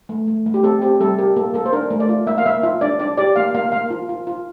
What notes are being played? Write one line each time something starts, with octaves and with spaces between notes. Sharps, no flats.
A3
A3
A3
G4
C4 A4
C4 G4
G3 A4
G4 A#4
A#3 A4
A#3 A4
C5
D4 A#4
A3
D5
F4
A#3 E5
F5
A#3 E5
F4 E5
D4 D5
D4 D5
G4 D5
A#3 F5
A#3 F5
A#3 F5
F4
F4
F4